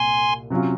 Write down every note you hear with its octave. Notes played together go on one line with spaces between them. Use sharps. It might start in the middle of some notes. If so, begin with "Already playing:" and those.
Already playing: C2 A#2 G#5 C6
C3 F#3 C#4 F4